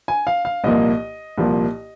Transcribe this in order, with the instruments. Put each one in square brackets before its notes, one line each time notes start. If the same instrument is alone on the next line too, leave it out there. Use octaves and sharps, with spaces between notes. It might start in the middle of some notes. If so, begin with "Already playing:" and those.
[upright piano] G#5
F5
F5
C2 A#2 F3 A#3 D#5
C2 A#2 F3 A#3